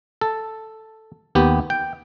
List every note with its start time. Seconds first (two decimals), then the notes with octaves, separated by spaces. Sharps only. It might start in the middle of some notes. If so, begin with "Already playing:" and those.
0.21 A4
1.35 D#2 B3 G4
1.70 G5